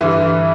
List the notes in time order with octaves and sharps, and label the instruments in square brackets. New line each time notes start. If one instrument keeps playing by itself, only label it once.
[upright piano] G2 D3 E3 E4